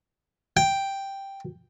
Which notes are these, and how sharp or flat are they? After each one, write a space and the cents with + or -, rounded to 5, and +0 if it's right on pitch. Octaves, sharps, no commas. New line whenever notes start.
G5 +0